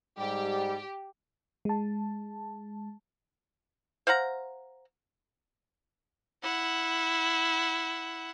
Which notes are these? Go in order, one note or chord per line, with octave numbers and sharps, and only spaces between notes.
G#2 G3 G4
G#3 A5
C5 F5 F#5 A#5
E4 F#5